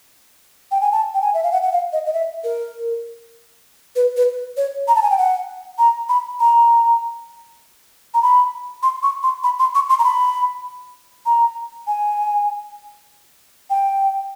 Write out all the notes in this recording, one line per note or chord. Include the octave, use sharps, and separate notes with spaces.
G5
G#5
A5
G5
G#5
E5
F5
F#5
F#5
F5
D#5
D#5
E5
A#4
B4
B4
C#5
A#5
A5
G#5
G5
F#5
A#5
B5
A#5
A#5
B5
C6
C#6
C6
B5
C6
C#6
C6
A#5
B5
A#5
G#5
G5